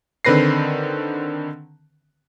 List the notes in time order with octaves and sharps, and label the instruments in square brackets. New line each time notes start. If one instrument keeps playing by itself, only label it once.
[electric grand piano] D3 D#3 C4 B4 A#6 C7